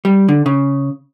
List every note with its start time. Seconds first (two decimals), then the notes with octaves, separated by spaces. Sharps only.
0.05 G3
0.29 D3
0.46 C#3